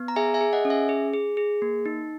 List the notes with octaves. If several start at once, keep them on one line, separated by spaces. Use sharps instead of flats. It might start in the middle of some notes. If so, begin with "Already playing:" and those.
Already playing: B3
A#5
G#4 E5 G#5
E5 G#5
G#4
D#5 F#5
C#4
E5 G#5
G#4
G#4
G#4
A#3
D#4